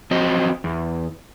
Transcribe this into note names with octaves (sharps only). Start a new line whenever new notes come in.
F3 C4 F#4 C5 D#5
E2